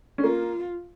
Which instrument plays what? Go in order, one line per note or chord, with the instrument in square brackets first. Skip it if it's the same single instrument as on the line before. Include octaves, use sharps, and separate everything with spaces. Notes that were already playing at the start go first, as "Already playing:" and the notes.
[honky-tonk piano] C#4
[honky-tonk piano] A#3 [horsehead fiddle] F4